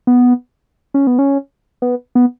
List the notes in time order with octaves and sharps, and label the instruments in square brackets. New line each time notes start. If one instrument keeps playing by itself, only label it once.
[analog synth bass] B3
C#4
B3
C#4
B3
B3